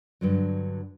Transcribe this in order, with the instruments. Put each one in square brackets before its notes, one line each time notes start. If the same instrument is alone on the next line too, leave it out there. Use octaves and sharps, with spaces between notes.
[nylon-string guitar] G2 D3 F#3